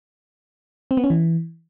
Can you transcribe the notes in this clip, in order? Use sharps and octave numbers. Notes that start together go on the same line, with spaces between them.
C4
B3
C#4
E3